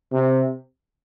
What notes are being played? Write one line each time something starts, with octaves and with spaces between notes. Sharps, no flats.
C3